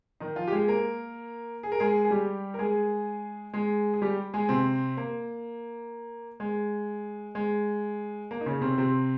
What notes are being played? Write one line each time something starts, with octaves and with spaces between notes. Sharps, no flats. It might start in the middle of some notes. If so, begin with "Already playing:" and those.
D#3 D#4
F3 F4
G4
G#3 G#4
A#3 A#4
G#4
A#4
G#3 G#4
G#4
G3 G4
A#4
G#3 G#4
G#3 G#4
G#4
G3 G4
G#3 G#4
C3 C4
A#3
G#3
G#3
A#3
D#4
C#3 C#4
C3 C4
C3 C4